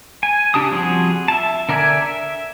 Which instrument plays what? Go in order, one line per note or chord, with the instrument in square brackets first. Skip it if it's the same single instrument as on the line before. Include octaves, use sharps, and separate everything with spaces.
[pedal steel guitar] G#5
C#3 D4 G4 A5 D#6
F3 G3 C4 F#4 G#4
E5 A5
D3 A#4 D5 E5 G#5
E5